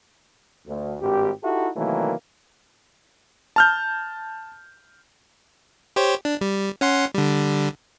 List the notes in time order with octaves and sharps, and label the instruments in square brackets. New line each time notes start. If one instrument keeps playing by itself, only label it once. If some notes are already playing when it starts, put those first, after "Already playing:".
[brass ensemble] D2
G#1 G2 G4
D#4 E4 F#4 G4 A4 E5
C3 D#3 E3 F#3 A3 A#3
[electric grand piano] A5 F6 G6
[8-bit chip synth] G4 C5 C#5
D4
G3
C#4 F#5 C6
D3 G3